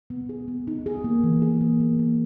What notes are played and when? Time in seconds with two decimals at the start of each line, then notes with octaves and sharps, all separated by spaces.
0.10 B3
0.29 G#4
0.48 B3
0.67 D#4
0.86 G#4
1.04 A#3
1.24 E3
1.42 G#4
1.61 A#3
1.80 A#3
1.99 A#3